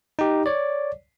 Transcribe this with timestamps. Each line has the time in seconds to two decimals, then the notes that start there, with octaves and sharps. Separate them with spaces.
0.19 D#4 G4
0.46 C#5 D5